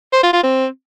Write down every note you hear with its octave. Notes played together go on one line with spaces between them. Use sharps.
C5
F4
F4
C4